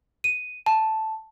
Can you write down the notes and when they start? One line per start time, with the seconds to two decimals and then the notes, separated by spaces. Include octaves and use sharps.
0.24 D#7
0.66 A5